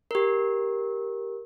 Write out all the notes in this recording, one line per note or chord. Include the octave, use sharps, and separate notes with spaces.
G4 A#4